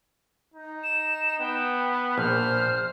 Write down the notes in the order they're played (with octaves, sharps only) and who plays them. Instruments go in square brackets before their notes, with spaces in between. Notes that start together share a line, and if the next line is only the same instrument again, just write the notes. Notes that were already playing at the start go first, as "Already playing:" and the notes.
[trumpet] D#4
[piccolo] E7
[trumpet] B3 [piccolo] G5
[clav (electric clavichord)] A#1 [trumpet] C5 [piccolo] F6